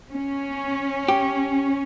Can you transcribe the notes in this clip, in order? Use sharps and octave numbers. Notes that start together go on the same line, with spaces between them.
C#4
G4